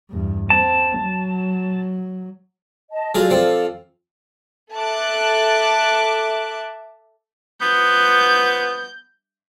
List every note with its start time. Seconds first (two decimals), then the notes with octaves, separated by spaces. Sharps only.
0.10 E2 G2
0.50 C4 A5
1.00 F#3
2.91 D#5 A5
3.15 F#3 F4 G#4 A4 D5 F5
3.30 F3 C4
4.74 A4 E5 A5 D6 F#6
7.62 F3 B3 G6